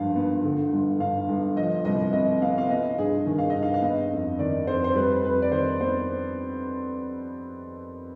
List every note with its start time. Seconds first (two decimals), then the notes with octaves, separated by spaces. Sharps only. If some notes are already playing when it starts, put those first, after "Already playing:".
Already playing: G#1 G2 F3 F5
0.16 B3
0.44 D3
0.73 G1
1.00 G2 F5
1.28 G1
1.56 F3 D#5
1.85 C2 D#5
2.13 C3 D#5
2.41 B3 F5
2.58 F5
2.69 B3 D#5
2.98 G2 G#4
3.26 D#3
3.38 F5
3.50 G2 D#5
3.63 F5
3.74 F5
3.82 B3 D#5
4.11 F2
4.39 D#3 D5
4.67 F2 C5
4.84 C5
4.95 G3 B4
5.23 F2 B4
5.42 D5
5.52 D#3 C5
5.80 B3 C5